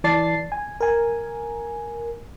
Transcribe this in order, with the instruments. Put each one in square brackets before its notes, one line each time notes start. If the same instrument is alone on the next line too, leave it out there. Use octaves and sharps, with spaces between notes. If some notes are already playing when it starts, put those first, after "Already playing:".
[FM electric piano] E3 D5 A5 A6 C7
G#5
A#4 G#5